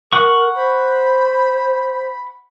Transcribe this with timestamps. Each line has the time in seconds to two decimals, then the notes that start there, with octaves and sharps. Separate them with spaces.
0.13 A#4 F#5 C#6
0.55 C5 B5